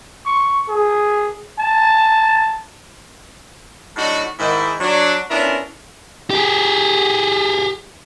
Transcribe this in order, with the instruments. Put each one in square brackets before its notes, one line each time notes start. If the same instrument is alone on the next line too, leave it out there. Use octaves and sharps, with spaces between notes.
[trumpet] C#6
G#4
A5
[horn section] A2 F#3 D4 D#4 F#4
G#2 D#3 E4
F#3 D4
B3 C#4 D4 E4 F4 A#4
[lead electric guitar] G4 G#4